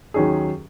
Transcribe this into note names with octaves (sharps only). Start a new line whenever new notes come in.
D#2 D#3 F#3 C#4 G#4